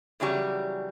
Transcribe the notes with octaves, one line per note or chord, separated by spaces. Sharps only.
E2 C#3 F#3 G3